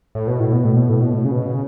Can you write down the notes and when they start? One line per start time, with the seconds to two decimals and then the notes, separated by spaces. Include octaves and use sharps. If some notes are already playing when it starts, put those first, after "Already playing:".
0.15 A2
0.28 B2
0.40 A2
0.53 B2
0.65 A2
0.76 B2
0.89 A2
1.02 B2
1.13 A2
1.25 C#3
1.31 B2
1.46 C#3